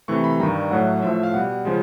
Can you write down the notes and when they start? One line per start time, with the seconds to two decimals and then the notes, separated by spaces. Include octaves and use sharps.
0.08 C3 E3 A3 C#6
0.24 B5
0.39 G2 D#3 G3 A#5
0.71 A2 F#3 A3 F#5
1.02 A2 F3 A3 E5
1.13 E5
1.23 F5
1.34 B2 G3 F#5
1.65 C#3 F3 G#3